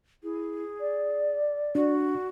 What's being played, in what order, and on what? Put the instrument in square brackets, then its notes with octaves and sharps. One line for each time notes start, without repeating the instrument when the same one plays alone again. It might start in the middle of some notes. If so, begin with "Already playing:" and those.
[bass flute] E4 [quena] G#4
[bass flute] D5
[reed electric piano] D4 [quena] F#4